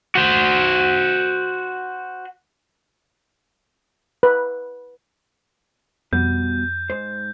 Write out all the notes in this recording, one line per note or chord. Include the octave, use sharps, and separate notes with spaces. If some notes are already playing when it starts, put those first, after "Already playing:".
F#4 C5
B4
F2 B2 G3 G6
G#2 C5